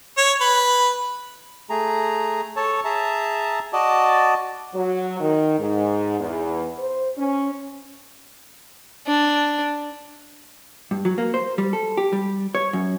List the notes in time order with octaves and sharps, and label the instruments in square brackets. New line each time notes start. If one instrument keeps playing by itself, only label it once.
[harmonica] C#5
B4
[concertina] A3 G#4 A#5
A4 C#5 A5
G#4 E5 A5 A#5
F#4 D5 D#5 A5
[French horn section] F#3
D#3
G#2
E2
C5
C#4
[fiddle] D4
[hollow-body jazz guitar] G2
F#3
A#3
C5
G3
A4
G4
G3
C#5
F#2